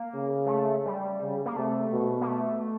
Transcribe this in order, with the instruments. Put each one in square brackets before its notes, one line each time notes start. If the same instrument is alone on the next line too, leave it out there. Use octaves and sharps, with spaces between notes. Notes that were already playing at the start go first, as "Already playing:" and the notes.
Already playing: [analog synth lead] A#3
[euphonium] C#3
[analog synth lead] G#3
A3
G3
[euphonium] C#3
[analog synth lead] A#3
[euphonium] C3 [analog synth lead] A3
[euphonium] B2
[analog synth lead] A#3
A3